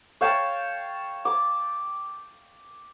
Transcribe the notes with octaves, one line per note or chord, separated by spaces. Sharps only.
C#5 F5 G5 A5
D6